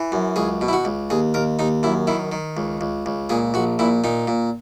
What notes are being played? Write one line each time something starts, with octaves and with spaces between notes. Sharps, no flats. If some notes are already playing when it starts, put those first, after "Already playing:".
Already playing: E3
F#2
C#2 G#4
B2
E4
F#4
C#2
D#2 G#4
D#2 A#4
D#2 D#4
F#2 E4
D#3 E4
D#3
C#2
C#2
C#2
A#2 G#4
A#1 F#4
A#2 E4
A#2 D#4
A#2